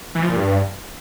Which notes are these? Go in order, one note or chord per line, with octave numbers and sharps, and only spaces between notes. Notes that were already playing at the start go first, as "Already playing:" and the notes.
E3
F3
A#2
G2